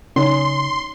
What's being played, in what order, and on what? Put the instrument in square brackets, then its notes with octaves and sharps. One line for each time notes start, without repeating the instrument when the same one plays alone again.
[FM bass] C#3 [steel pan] C#4 D#4 [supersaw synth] C6